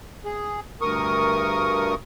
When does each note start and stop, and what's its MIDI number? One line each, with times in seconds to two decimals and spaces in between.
0.25 0.60 68
0.81 1.95 38
0.81 1.95 43
0.81 1.95 70
0.81 1.95 85
0.81 1.95 87